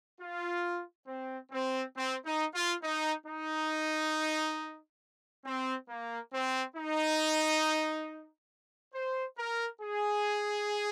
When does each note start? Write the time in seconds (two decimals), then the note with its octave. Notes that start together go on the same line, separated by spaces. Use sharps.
0.20 F4
1.07 C4
1.51 C4
1.95 C4
2.25 D#4
2.53 F4
2.82 D#4
3.26 D#4
5.45 C4
5.89 A#3
6.32 C4
6.75 D#4
8.94 C5
9.37 A#4
9.81 G#4